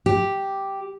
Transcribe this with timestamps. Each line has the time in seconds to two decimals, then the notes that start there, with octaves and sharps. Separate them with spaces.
0.06 G4